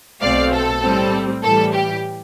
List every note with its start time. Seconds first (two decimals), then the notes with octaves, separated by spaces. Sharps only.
0.20 B1 B2 A3 C4 D5 F5
0.52 A4
0.81 A2 G3 C4
1.42 A2 E3 G3 A4
1.73 G4